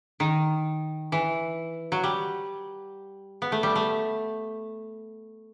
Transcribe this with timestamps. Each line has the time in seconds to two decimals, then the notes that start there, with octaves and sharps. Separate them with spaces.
0.20 D#3
1.12 E3
1.92 F#3
2.04 G3
3.42 B3
3.52 A3
3.63 G3
3.76 A3